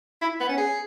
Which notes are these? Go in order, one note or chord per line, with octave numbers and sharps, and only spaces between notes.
E4
B3
C#4
G#4